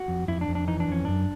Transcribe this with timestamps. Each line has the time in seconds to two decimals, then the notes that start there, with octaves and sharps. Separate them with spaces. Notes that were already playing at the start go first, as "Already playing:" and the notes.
Already playing: F#4
0.08 F2
0.28 F2 E4
0.41 D4
0.48 F2
0.55 D4
0.68 E3 D#4
0.80 D4
0.88 F2 C#4
1.05 F#2 D4